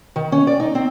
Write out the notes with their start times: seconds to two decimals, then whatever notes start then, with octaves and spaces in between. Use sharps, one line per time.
0.16 D#3
0.32 C#4
0.47 D5
0.60 D#4
0.75 C4